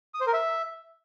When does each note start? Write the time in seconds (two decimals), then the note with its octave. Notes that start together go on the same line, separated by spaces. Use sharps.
0.14 D#6
0.21 C5
0.27 A#4
0.33 E5